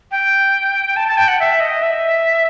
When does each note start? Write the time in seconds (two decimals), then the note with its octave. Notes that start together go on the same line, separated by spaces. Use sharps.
0.11 G5
0.96 A5
1.08 A5
1.17 G5
1.28 F#5
1.40 E5
1.60 D#5
1.82 E5